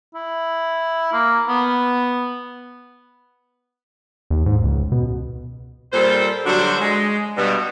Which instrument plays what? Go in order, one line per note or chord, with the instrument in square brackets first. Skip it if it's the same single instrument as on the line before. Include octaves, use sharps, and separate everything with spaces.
[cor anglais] E4
A#3
B3
[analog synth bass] D#2
G#2
C#2
B2
[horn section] A#2 G3 A4 C5
D3 F#3 G3 D4 F#4 C5
G#3
G2 B2 G3